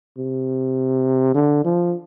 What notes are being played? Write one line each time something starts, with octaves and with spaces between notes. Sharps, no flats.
C3
D3
F3